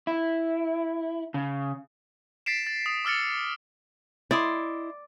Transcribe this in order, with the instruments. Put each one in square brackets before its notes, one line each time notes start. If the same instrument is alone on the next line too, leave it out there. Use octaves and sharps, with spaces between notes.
[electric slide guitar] E4
C#3
[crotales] A6 B6 C7 D7 E7
A6
D#6
D6 E6 F6 A6 C#7
[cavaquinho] E4 D#5 C6 [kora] D5